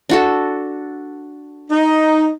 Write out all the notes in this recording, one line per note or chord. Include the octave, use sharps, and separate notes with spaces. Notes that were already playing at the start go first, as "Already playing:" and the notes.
D4 F#4 A4
D#4